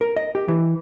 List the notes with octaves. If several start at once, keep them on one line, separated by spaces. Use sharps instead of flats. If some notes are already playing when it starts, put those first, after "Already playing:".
A#4
D#5
G4
E3